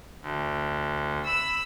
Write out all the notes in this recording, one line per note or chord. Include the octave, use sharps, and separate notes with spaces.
D2
B5 E6